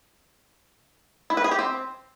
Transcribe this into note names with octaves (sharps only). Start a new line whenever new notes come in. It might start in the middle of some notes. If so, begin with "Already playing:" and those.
E4
B4
G#4
G4
C4